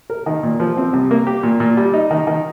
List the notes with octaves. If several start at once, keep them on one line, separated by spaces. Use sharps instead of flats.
A#4
D#3
A#2
F3
C4
C2
A#3
G4
A#2
A#2
G3
D#4
D#3
D#3